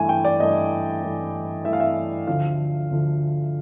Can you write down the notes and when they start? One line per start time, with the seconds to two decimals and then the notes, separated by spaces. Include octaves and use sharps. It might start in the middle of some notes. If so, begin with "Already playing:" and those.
Already playing: G2 E3 A3 G#5
0.09 G5
0.25 D5
0.40 G2 E3 A3 D#5
1.03 G2 E3 A3
1.65 G2 E3 A3 E5
1.73 F5
1.80 E5
2.27 D2 D3 F3 F5
2.91 D2 D3 F3